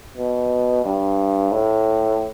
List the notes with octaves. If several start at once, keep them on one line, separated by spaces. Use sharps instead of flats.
B2
G2
A2